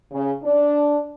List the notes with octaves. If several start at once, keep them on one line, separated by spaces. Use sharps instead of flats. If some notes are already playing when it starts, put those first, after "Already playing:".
C#3
D4